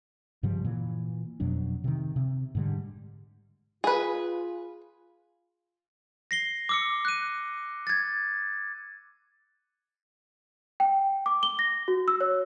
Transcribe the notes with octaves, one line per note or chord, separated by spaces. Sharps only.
G2 C#3 F3 G3
A#2 E3
F2 B2 F#3 D4
C3 D#3
C3
G#2 D3 G3
F4 G#4 B4
A#6 C7 G7
D6 E6 C#7
F#6 D#7
G#6 A6
G5
D6
G7
A#6
F#4
E6
C#5